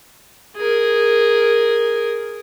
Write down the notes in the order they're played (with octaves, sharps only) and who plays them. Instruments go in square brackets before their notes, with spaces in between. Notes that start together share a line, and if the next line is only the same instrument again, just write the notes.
[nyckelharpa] G#4 A#4